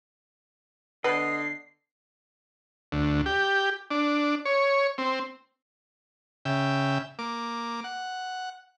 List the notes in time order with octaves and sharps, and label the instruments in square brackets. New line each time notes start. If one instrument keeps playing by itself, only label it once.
[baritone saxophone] D3 [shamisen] B3 B4 [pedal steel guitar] D#5 [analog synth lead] C7
[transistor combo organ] D2
G4
D4
C#5
C4
C#3 E5 G5
A#3 D6
F#5